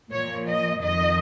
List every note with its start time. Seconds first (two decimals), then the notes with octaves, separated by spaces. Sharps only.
0.11 A#2 F3 C#5
0.47 D#5
0.81 F2 D#3 D#5